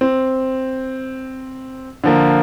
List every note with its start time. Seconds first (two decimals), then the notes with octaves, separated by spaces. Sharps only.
0.01 C4
2.04 D3 F3 A#3